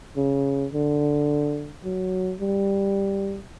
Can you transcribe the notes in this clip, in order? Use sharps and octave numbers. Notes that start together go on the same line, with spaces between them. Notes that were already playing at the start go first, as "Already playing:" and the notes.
C#3
D3
F#3
G3